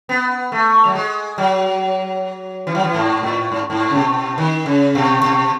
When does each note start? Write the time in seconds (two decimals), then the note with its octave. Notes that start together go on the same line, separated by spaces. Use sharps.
0.09 B3
0.52 A3
0.85 F#3
0.95 G#3
1.38 F#3
2.67 E3
2.75 F#3
2.84 E3
2.94 G#2
3.23 A2
3.52 G#2
3.70 G#2
3.90 C#3
3.95 B2
4.38 D#3
4.66 C#3
4.95 B2
5.23 B2